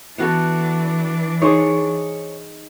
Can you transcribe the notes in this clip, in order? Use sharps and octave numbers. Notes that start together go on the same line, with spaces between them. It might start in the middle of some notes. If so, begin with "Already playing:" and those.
E3 B3 D4 F#4 A4
D#4 G#4 C5 C#5